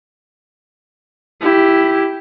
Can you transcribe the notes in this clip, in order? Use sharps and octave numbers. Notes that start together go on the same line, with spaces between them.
E4 G4